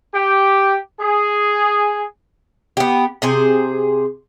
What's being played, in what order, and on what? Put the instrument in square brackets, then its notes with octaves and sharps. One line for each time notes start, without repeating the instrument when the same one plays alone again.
[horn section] G4
G#4
[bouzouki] B3 G4
C3 G#4 C5